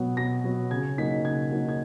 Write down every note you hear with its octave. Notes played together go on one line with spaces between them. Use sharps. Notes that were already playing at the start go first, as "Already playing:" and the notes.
Already playing: B2 F#3 B3
B2 A#6
F#3 B3
C#3 G#6
F#3 A#3 D#4 B6
C#3 G#6
F#3 A#3 D#4
G#6